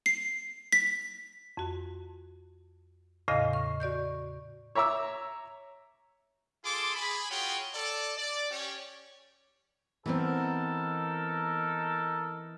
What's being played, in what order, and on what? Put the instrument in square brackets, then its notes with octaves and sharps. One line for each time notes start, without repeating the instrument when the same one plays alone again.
[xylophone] C7
B6
[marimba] F2 F#4
E2 A2 C#3 D#5 F5 A#6
C#6
F#4 D5 C#6 G6
[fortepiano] C#5 E5 A#5 D6 E6
[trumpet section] F4 G#4 A4 C6 D6
G#4 B5
F4 F#4 G#4 C#5 G5
A4 D5
D5
C#4 G4 C#5
[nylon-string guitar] E3 B3 C4 [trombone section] D#4 A4 A#4